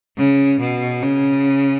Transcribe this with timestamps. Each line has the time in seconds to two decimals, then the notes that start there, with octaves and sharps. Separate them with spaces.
0.17 C#3
0.60 B2
1.03 C#3